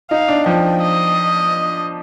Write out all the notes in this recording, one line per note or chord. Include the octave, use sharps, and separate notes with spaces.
D#4 F5
D4
F3 G5
D#5